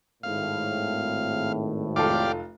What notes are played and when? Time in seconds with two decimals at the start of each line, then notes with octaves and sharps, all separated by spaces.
0.23 G#1 A2 F5
1.96 F1 F4 G4 A4 D5 F5